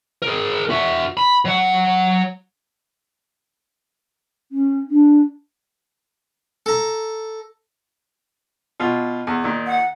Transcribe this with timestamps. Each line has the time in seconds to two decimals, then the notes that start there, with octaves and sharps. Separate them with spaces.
0.22 G#4 A#4
0.70 F#4 E5
1.17 B5
1.45 F#3 F#5
4.52 C#4
4.90 D4
6.66 A4 A#5
8.80 B2 F4
9.27 E2
9.44 A#2 D#3
9.67 F#5